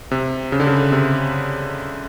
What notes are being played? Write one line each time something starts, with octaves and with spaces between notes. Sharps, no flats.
C3
C#3
D3
C#3
C3